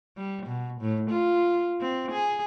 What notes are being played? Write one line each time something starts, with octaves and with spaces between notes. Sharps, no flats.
G3
B2
A2
F4
C4
G#4